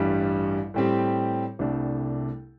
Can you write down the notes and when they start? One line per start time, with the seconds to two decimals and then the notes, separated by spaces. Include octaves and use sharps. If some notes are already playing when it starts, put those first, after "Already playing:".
Already playing: A1 G2 G3
0.74 A2 G3 C4 G4
1.59 C2 C3 A3 D4 A4